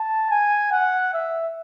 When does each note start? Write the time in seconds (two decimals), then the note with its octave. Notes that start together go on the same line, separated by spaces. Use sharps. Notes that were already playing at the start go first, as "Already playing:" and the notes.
Already playing: A5
0.31 G#5
0.72 F#5
1.13 E5